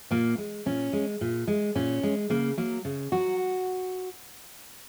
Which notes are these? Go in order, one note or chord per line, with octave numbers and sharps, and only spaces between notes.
A#2 A#3
G#3
A#2 C#4
G#3
A#2
G#3
A#2 C#4
G#3
C#3 A#3
F#3 A#3
C#3
F#3 F#4